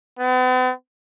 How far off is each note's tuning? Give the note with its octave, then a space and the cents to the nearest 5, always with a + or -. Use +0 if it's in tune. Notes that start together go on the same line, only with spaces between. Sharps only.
B3 +45